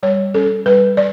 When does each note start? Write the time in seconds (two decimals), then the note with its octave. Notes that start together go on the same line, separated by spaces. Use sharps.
0.03 G3 C#5
0.34 C#4 A4
0.66 G3 B4
0.97 D5